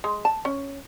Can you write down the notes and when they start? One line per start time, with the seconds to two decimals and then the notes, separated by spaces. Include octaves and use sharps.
0.04 G#3
0.25 A5
0.45 C#4